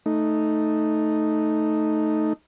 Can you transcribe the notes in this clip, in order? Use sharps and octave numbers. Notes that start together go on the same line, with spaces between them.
A3 D#4